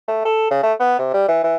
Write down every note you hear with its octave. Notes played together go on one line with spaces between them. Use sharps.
A3
A4
C#3
A3
B3
C3
G3
E3
E3